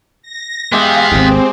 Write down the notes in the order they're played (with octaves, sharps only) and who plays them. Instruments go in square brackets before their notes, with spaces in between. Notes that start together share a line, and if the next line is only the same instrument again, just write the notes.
[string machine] A#6
[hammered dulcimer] G#3 G4 G#4 [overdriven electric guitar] B3 E5 [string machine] F5
[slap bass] G#1 D#2 [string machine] C4